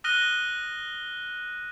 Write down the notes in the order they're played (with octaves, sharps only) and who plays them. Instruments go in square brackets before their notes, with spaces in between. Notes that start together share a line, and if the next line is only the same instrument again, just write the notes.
[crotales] D#6 F6 F#6 A#6 D#7 G7